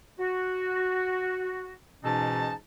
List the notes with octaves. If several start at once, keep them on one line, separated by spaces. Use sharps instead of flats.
F#4
G#2 B2 E3 C#4 D#4 A5